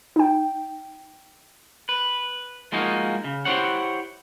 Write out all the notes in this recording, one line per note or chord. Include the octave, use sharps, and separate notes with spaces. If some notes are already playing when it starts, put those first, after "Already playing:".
D#4 G5
B4
F3 G#3 A#3 D#4 F#4
C#3
E4 G4 C5 C#5 F#5